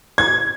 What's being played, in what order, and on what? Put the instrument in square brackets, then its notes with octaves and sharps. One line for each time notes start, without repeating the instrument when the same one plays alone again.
[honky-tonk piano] G#6